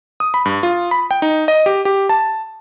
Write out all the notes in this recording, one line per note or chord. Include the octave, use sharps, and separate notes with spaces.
D#6
B5
G2
F4
B5
G5
D#4
D#5
G4
G4
A5